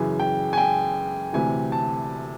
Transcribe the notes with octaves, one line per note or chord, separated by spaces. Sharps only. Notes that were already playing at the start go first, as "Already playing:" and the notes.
Already playing: F#2 C#3 E3 G#5
G5
G#5
G5
D2 C3 E3 G#5
A5